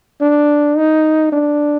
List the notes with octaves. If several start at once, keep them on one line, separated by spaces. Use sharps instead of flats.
D4
D#4
D4